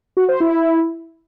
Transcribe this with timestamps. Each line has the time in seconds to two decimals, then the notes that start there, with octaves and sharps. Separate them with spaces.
0.17 F#4
0.29 C5
0.40 E4